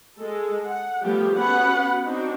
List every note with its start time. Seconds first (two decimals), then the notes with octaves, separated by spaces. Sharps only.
0.16 G#3 A4
0.64 F#5
1.03 F3 G3 A3 B3 G4 G#4
1.35 B3 C#4 F#4 B4 F#5 B5
2.04 C4 D4 D#4 F#4